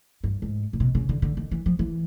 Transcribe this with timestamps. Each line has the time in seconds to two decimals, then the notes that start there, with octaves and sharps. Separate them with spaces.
0.24 G2
0.42 G#2
0.73 A#2
0.80 B2
0.95 C#3
1.09 D3
1.22 D3
1.37 D#3
1.51 E3
1.66 F3
1.79 E3